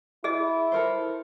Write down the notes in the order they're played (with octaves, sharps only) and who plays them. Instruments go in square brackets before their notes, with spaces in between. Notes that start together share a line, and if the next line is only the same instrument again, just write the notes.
[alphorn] E4 [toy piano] G#4 D#5
[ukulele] A4 A#4 C5